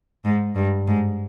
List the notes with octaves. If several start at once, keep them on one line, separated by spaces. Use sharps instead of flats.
G#2
G2
G#2